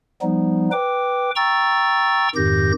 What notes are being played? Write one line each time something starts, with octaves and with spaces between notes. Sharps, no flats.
F3 G3 B3 D#4
B4 G5 D6
G5 A#5 C#6 E6 A6
F2 G#2 D#3 G4 G6 A#6